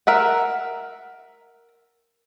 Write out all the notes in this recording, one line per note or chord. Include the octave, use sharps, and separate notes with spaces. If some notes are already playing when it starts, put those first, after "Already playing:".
A#4 E5 F#5